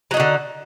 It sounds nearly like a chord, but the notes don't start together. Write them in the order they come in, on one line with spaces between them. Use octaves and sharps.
F#3 D#4 F#4 D3